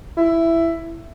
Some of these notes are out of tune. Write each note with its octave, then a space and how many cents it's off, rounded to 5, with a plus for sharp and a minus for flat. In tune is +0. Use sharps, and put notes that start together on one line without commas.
E4 +10